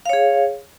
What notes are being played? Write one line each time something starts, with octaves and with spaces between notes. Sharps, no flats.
G#4 C#5 F5